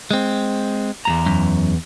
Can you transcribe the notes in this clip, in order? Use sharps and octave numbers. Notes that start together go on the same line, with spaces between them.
G#3 C4
E2 G2 A#5
F#2